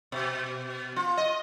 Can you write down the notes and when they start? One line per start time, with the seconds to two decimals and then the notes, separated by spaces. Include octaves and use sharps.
0.12 B2
0.96 F4
1.17 D#5